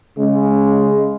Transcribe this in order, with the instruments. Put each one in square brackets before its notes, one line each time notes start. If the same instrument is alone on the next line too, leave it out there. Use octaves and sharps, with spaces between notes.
[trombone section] C#3 G#3